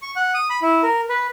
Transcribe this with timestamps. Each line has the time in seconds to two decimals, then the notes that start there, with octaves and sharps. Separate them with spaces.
0.02 C#6
0.16 F#5
0.34 D#6
0.50 B5
0.62 E4
0.83 A#4
1.09 B4